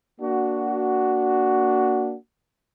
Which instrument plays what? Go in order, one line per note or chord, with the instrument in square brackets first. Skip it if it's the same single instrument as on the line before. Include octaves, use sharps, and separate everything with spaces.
[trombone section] A#3 D4 F#4